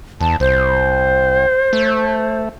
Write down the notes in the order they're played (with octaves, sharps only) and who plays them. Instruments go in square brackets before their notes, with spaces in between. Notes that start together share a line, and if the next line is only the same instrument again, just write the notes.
[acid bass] E2 [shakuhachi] A5
[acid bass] C2 [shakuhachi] C5
[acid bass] A3